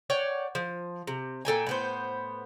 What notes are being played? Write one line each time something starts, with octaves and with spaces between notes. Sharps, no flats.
C#5 D5 F#5 G5
F3
C3
A#2 A4 G5 G#5
A2 B3 C5